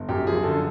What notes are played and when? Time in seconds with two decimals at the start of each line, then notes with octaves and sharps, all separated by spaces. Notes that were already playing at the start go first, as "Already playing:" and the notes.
Already playing: G1
0.09 F#2 G4
0.26 F3 G#4
0.43 D3 A4